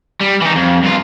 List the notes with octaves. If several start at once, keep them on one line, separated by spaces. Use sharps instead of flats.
G3
E3 D#4
F2
G2 F4